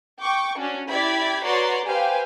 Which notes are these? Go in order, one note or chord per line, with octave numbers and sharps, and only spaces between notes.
G5 C#6 D6
C#4 D4 F#4
E4 G4 D5 B5 G#6 B6
F#4 B4 C#5 D5 A#5 C6
G4 B4 C5 F5 G5 G#5